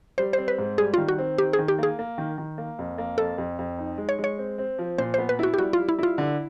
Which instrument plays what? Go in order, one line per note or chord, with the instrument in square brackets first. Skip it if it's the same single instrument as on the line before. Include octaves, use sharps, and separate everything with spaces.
[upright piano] G3 [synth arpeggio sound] C5
[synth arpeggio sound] C5
[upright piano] C4
[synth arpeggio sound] B4
[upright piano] G#2
[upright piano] G3 [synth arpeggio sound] G#4
[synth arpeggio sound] F4
[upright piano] D#3
[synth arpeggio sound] F#4
[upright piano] C4
[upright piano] D#3 [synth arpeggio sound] G4
[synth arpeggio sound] G#4
[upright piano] D#3
[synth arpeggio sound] G4
[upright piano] A#3 [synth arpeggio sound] G#4
[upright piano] A#3
D#3
D#3
A#3
F2
A#3
[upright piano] F2 [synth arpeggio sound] A4
[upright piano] F2
F2
D#4
G#3
[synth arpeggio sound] C#5
[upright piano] G#3
[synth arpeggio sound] C#5
[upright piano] C4
C4
F3
[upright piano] A#2 [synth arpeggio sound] C5
[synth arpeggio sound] C5
[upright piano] B3
[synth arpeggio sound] B4
[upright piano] E4 [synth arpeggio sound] F#4
[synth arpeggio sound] G4
[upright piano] G3 [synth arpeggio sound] F#4
[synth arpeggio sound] F4
[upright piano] G3
[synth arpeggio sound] E4
[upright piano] E4 [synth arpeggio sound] F4
[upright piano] D3